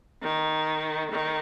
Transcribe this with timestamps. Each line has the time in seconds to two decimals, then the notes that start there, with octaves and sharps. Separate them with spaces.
0.22 D#3
1.11 D#3